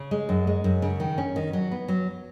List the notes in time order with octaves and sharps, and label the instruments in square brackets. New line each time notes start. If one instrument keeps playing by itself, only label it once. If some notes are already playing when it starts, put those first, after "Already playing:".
Already playing: [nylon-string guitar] C#3
G#3
F#2
G#3
F#2
C#3
D#3
C#4
D#3
F#3
B3
F#3